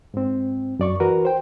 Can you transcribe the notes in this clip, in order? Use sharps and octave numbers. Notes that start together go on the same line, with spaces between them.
G#2 C4
F#2 D5 C#6
E3 F#4 A#4 B4
C5 G5